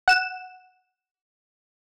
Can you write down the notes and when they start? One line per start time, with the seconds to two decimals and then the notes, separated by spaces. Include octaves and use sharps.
0.08 F#5 E7